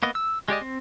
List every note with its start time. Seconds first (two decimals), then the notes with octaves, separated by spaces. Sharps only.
0.03 A#3 B3 D#5
0.15 E6
0.48 G#3 G4 D5 D#5
0.61 C4